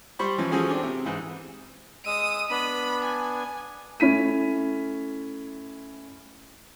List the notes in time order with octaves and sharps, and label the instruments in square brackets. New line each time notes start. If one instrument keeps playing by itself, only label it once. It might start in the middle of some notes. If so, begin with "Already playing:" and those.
[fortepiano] G3 C5 B5 C#6
E3 F3 C#4
F3 C#4 F#4 G#4 A4
C4 D4
C3
G#2 E3
[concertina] G#3 E6 [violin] D#6 D#7
[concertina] B3 D4 [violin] B5
[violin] G#5
[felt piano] A3 C#4 E4 B6 D#7